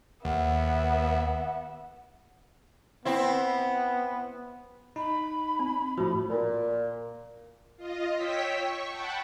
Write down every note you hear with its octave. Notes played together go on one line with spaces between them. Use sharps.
D#2 B3 E5 F#5
B3 C4 E4
D#4 B5
C4
A2 F3 F#4
A#2
F4 D#5
C#5 G5 E6 B6
C#6
F#5 G5 A5 B5